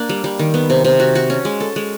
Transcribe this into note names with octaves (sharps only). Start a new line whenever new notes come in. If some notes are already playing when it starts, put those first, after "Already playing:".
Already playing: A#3 D4
G3
G3
D#3
B3
C3
C3
F#4
F#4
C#4
G#3
A4
G#3